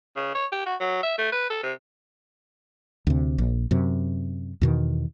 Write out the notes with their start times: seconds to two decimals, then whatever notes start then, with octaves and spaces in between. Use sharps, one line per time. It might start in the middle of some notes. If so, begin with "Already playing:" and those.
0.17 C#3
0.35 C#5
0.52 G4
0.66 F#4
0.80 F#3
1.03 E5
1.18 A3
1.32 B4
1.50 A4
1.63 C3
3.07 D2 C3
3.38 A#1
3.71 F#2 C3
4.61 E2 B2 D#3